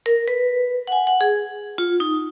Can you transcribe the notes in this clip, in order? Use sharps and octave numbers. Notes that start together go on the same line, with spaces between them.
A#4
B4
F#5
G#5
F#5
G#4
F4
D#4